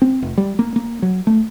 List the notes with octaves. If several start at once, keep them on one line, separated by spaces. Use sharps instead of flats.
C4
F1
G3
A#3
A#3
F#3
A3